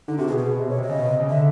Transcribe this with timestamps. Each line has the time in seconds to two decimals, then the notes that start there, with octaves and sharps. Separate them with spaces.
0.08 D3 D#4
0.18 C3 F#4
0.27 B2 G#4
0.38 G#4
0.59 C3
0.68 B2 C#5
0.78 C3
0.83 D#5
0.89 C#3
0.99 B2
1.09 C3
1.20 C#3
1.29 D3 E5